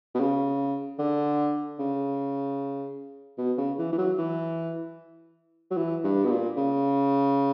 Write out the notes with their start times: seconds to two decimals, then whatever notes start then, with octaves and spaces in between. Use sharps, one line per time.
0.14 B2
0.20 C#3
0.98 D3
1.79 C#3
3.37 B2
3.58 C#3
3.78 E3
3.92 E3
3.98 F#3
4.18 E3
5.71 F#3
5.77 E3
6.04 G2
6.24 B2
6.30 A#2
6.56 C#3